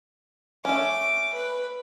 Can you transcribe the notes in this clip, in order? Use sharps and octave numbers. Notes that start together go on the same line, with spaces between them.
A3 C#4 D6
B4